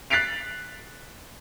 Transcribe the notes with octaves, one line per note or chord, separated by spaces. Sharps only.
F#6 A6 B6 C7 D7 F7